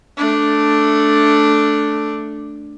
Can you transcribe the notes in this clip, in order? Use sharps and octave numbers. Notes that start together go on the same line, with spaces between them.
A3 D4